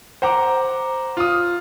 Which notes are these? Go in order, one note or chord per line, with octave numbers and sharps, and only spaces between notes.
C5 F#5 A#5 D6
F4 D#6